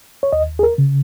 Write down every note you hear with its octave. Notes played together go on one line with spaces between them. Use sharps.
C#5
D#2 D#5
G#4
A#4
C#3